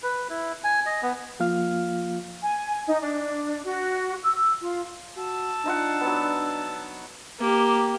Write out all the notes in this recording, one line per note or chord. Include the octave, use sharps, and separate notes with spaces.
B4
E4
G#5
D#5
B3
F3 A#3 F4 F5 F6
G#5
D#4
D4
F#4
E6
F4
F#4 A5 E6
D4 D#4 F4 F#5
F#3 B3
A#3 G4